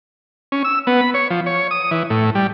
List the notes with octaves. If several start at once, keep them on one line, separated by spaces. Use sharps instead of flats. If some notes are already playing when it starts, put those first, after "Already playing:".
C#4
E6
B3
B5
C#5
F3
C#5
D#6
E3
A2
G3